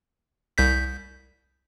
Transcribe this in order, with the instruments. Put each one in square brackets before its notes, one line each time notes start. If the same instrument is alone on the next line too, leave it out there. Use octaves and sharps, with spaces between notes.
[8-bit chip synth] C2 G6 B6